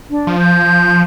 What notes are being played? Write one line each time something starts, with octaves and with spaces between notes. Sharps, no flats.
D4
F3
G6